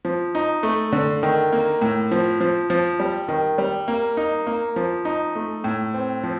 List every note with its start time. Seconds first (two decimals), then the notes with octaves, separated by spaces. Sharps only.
0.05 F3
0.35 D#4
0.63 A3
0.92 D3
1.23 D#3
1.52 A#3
1.81 A2
2.11 F3
2.40 F3
2.70 F3
3.00 G3
3.28 D#3
3.58 G3
3.88 A#3
4.17 D#4
4.47 A#3
4.76 F3
5.05 D#4
5.35 A3
5.64 A2
5.94 C4
6.24 F3